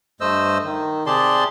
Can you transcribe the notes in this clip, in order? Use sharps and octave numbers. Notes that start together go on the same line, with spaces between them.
G2 A3 C5 D#5 E6
D#3
C3 G4 G#4 D5 A5 C6